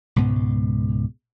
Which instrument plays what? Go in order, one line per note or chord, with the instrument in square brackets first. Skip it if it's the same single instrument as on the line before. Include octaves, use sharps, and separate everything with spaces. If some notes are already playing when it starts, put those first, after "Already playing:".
[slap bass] C#2 G#2 B2 B3